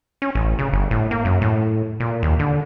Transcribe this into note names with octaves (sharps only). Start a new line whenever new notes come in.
C#4
A1
C#3
G1
A2
A#3
F#2
A2
A#2
D#2
D3